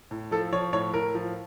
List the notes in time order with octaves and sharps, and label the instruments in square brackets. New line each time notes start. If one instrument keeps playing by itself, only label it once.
[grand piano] A2
F3 A4
F3 C#5
A2 C#5
A2 A#4
F3